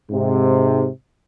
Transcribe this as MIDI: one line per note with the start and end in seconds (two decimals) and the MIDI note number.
0.10 0.87 44
0.10 0.87 48